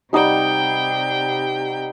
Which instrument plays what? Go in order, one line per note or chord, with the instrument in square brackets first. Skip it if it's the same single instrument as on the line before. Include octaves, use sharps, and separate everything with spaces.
[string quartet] C3 G5 [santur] G3 D#4 F#5